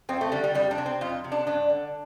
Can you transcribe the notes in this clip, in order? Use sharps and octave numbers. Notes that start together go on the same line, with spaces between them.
F2 C4
A3
D3 G3
G3
F2 G3
D4
C3
C4
F2 F4
C3
D4
G2 D4
D3